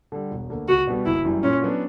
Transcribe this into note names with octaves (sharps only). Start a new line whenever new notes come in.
D3 G3
E1
D2 D3 A#3
C#2 F#4
B2 G3 B3
F#1 E4
F#2 E3 G3
A#2 C#4
F#3 B3 D4